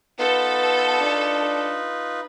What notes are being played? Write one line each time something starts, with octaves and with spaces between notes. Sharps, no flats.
B3 D#4 F4 A4 B4
D4